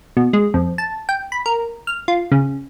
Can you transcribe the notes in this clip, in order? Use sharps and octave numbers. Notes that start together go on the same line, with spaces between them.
B2
G#3
F2
A5
G5
B5
A#4
F6
F4
C#3